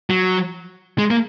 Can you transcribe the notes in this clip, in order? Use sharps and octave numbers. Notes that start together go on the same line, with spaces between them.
F#3
G#3
A#3